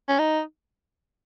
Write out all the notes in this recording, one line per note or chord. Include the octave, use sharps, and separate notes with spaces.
C#4
D#4